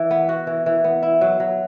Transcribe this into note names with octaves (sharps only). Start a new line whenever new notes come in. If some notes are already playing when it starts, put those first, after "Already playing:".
Already playing: E3
B3
F#4
E3
E3
B3
E4
F#3
F#3